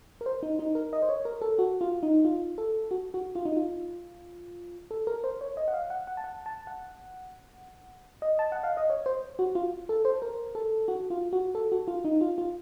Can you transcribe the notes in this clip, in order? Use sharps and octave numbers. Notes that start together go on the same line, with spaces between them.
A#4
C5
D#4
D#4
A#4
D#5
C5
C#5
A#4
A4
F#4
F4
D#4
F4
A4
F#4
F#4
F4
D#4
F4
A4
A#4
C5
C#5
D#5
F#5
F5
F#5
F#5
A5
F#5
A5
F#5
D#5
A5
F#5
F5
D#5
C#5
C5
F#4
F4
A4
C5
A#4
A4
F#4
F4
F#4
A4
F#4
F4
D#4
F4
F4